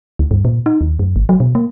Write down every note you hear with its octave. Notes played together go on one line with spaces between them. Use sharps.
D2
G2
A#2
D#4
D#2
F#2
G#1
F#3
B2
A#3